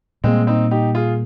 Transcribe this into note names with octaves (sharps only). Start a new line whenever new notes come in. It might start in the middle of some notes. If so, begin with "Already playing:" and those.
A#2 G3 G#3 A#3 C4
C4 D#4
D#4 G4
F4 G#4